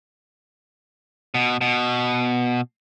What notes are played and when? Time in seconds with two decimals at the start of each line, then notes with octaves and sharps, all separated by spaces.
1.34 B2
1.61 B2